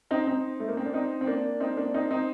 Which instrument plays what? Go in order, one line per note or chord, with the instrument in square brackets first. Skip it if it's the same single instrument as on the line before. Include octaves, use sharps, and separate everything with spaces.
[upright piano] C4 D#4
C4 D#4
A3
A#3
C4
D4
C4 D#4
C4
A#3 D4
C4 D#4
A#3 D4
C4 D#4
C4 D#4